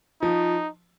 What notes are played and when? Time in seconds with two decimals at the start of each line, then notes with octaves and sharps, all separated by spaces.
0.21 F3 D#4